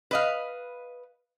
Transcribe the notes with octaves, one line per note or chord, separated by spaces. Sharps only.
B4 D#5 F5